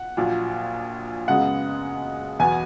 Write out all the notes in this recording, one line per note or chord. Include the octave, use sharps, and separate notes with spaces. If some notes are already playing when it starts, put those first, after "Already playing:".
Already playing: F#5
A#1 A#2 F#3
F#2 C#3 G#3 B3 F#5
E2 B2 F#3 B3 G#5